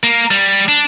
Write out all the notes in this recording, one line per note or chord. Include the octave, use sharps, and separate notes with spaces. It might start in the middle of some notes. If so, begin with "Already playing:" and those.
A#3
G3
D4